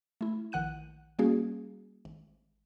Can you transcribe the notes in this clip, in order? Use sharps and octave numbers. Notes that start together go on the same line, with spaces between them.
A3 E4
A#1 D#3 F#5 F#6 D#7
G3 A#3 C#4 F#4 G#4
G#1